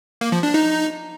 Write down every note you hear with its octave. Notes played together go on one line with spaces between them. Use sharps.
A#3
F3
D4
D#4